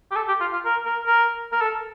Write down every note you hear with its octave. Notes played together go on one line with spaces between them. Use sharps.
G4
A4
G4
F4
F4
A#4
A#4
A#4
A#4
A4